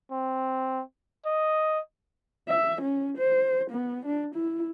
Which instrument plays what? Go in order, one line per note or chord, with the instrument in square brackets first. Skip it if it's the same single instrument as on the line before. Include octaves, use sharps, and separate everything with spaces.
[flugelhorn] C4
D#5
[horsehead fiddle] E5
C#4
C5
B3
D4
E4